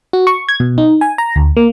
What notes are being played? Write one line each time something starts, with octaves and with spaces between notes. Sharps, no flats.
F#4
C#6
G#6
B2
D#4
G#5
A#5
D2
A#3